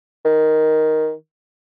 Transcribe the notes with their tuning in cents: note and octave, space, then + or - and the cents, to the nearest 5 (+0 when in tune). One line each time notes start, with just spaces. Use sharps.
D#3 +5